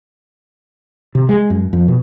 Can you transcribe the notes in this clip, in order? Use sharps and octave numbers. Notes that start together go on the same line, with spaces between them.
C3
G#3
F#2
F2
B2